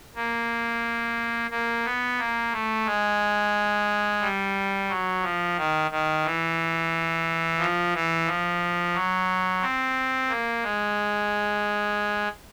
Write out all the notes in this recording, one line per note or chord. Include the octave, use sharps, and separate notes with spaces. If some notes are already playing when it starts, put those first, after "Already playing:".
A#3
A#3
B3
A#3
A3
G#3
G3
F#3
F3
D#3
D#3
E3
F3
E3
F3
F#3
C4
A#3
G#3